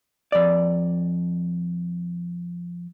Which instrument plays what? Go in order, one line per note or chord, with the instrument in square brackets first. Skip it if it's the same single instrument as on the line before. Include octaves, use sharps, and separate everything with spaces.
[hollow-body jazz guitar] F2 D5